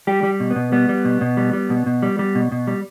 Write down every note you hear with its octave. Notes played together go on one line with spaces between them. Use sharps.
G3 G4
G3
B2
B3
B2
G3 B3
G3
B2
B2
G3
G3
B2
B2
G3
G3
B2
B2
G3